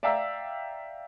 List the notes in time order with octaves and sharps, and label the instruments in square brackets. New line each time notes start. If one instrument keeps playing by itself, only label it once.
[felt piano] D5 E5 F5 G5 A#5 E6